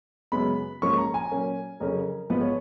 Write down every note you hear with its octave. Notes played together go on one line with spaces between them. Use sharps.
F#2 C#3 G#3 B3 B5
G#2 F3 A#3 C#4 C#6
A#5
G#5
A#2 F#3 A#3 C#4
F2 C#3 F#3 C#4 A#4
G#2 F3 G#3 B3 B4
C#5